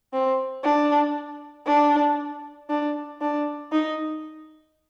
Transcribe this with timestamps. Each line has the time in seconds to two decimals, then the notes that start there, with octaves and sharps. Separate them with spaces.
0.13 C4
0.64 D4
1.66 D4
2.69 D4
3.21 D4
3.72 D#4